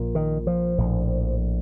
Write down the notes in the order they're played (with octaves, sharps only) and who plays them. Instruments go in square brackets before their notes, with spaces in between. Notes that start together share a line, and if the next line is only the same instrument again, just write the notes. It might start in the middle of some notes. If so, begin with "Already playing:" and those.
Already playing: [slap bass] A#1 A#2
D#3
F3
A#1 A2